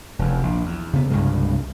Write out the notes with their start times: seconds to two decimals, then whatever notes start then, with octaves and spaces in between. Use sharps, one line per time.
0.19 F1 E2
0.43 A#1
0.66 E2
0.93 C#3 B3
1.10 C2 G2 C#3 G#3